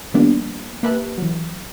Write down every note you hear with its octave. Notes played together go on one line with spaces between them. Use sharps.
D#3 F3 G3 A#3 B3 D4
A#3 G4 B4 E5 A5 F#6
E3 F#3